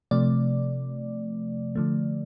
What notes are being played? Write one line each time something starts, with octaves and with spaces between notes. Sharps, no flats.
C3 F3 A3 D5
D3 F3 A3